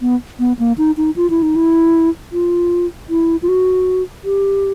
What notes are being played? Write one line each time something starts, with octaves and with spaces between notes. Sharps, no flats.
B3
B3
A#3
D#4
D#4
F4
E4
D#4
E4
F4
E4
F4
F#4
G4